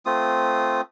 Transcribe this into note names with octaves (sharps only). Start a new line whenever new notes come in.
A3 C4 F4 D#6